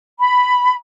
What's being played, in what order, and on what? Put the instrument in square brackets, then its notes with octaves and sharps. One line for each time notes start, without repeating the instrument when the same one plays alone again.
[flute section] B5